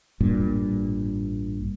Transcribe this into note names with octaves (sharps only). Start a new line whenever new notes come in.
A1 G2 A#2